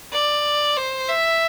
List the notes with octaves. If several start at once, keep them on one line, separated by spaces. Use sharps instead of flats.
D5
C5
E5